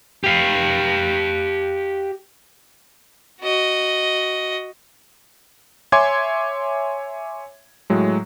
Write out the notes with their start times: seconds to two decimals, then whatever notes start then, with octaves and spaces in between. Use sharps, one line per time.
0.24 G4 F5
3.41 F#4 D#5
5.92 C#5 E5 G#5 C6 D6 G#6
7.90 A2 F#3 G#3